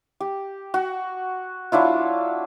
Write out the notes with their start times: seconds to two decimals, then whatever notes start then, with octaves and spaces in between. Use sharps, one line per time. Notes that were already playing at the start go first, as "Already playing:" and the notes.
0.20 G4
0.74 F#4
1.72 F#3 D4 E4 F4